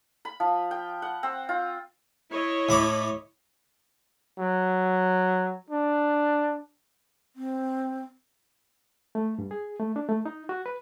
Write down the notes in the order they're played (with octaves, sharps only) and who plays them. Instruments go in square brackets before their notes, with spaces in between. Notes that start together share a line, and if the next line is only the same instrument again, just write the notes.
[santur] B5
F3
G5
F#5
C4
F4
[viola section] E4 C#5 D#5
[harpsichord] A2 B5 D6
[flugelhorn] F#3
D4
[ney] C4
[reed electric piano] A3
G2
G#4
A3
D4
A3
D#4
F#4
B4